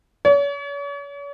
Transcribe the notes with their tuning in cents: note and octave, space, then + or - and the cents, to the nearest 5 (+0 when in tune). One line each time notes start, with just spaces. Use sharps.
C#5 +40